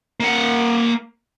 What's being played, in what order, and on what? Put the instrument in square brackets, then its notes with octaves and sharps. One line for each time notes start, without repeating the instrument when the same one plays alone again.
[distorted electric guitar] A#3 F#5